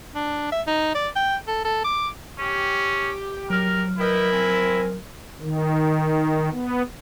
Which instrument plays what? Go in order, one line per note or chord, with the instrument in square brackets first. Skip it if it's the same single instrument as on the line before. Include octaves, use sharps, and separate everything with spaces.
[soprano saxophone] D4
E5
D#4
D5
G5
A4
A4
D6
[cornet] C#4 [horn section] G4
[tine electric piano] F#3 F6 [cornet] A#4
[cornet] E4 [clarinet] A#4 [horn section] B4 D#5 G5
[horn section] C4 G#5
[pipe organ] D#3
B3